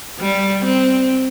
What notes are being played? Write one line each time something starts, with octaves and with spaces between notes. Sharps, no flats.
G3
C4